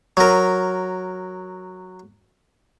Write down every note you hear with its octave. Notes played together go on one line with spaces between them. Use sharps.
F#3 A#4